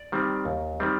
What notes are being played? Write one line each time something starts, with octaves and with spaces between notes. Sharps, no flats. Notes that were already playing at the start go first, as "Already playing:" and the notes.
Already playing: D5
D#3 G3 C4
D#2
D#3 G3 C4